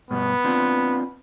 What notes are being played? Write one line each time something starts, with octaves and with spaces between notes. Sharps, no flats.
G2 B2 B3
C4 D4 F4